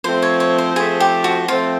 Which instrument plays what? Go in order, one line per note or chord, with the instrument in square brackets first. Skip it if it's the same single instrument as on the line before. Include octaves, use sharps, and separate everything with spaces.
[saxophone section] F3 A3 C4 [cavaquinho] C5
[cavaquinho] C#5
C#5
C5
[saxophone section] F3 A3 C4 [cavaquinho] G#4
[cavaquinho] G4
F#4
[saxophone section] F3 A3 C4 [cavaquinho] F4